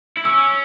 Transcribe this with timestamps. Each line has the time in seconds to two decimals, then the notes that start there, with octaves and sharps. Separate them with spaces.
0.17 E4
0.25 C#4 E6